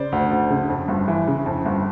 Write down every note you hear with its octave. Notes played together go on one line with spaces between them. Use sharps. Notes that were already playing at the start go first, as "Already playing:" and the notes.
Already playing: C#3 C5 D5
D2
D2
C#3
F2
G1
E3
C#3
F2
G1